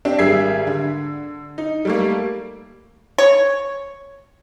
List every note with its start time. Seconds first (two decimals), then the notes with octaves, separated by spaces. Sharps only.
0.05 C4 D4 G4
0.19 G#1 G3 G#4 E5 G#6 C7
0.67 D3
1.58 D#4
1.85 G3 A3 A#3
3.18 C#5